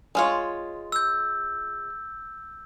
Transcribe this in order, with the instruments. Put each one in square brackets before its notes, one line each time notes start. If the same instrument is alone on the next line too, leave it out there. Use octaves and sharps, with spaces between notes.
[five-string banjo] G#3 F4 C#5
[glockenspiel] E6 G6